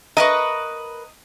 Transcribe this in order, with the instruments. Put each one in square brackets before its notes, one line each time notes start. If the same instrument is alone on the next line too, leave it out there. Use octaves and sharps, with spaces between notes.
[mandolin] A#4 B4 C#6 [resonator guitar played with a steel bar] D#5